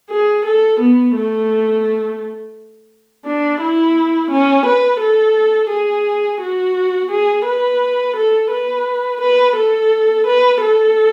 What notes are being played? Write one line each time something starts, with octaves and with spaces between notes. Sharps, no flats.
G#4
A4
B3
A3
D4
E4
C#4
B4
A4
G#4
F#4
G#4
B4
A4
B4
B4
A4
B4
A4